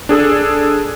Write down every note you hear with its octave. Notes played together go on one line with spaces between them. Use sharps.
D4 G#4 A4